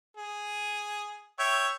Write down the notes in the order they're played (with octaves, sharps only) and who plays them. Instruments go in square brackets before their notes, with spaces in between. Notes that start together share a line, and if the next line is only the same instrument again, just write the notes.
[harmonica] G#4
C#5 E5 G5